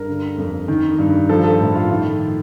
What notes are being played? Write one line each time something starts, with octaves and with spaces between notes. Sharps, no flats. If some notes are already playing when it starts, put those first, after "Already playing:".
Already playing: G2 A#4
D3
F2
D#3
G2
F3 A4
A4
A2
F4
D#3